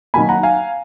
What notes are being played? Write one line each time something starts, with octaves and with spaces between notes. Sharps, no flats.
D#3 F#3 A#3 G#5 B5
F#5 A#5
F5 G#5